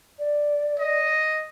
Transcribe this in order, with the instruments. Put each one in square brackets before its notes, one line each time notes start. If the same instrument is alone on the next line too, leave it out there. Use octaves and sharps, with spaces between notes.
[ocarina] D5
[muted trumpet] D#5